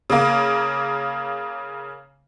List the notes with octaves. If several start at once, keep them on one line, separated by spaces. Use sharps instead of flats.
C#3 A#3